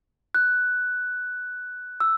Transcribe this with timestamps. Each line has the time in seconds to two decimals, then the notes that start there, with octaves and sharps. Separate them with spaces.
0.35 F#6
2.00 E6